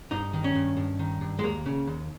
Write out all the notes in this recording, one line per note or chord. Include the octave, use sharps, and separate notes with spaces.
G2 D#4
D#3
C#4
G2
G2
D#3
G2
G#3
D#2 A#3
C#3
D#2